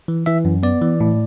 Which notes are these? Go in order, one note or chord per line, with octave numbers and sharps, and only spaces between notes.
E3
E3 E5
F#2
B3 D5
E3
A2